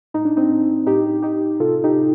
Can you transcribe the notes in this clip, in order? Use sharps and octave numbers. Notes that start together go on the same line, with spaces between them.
A2 D#4
D4
C4 D#4
A2
A2 D#4 G4
A2 D#4 G4
C3 F4 A4
D#4 G4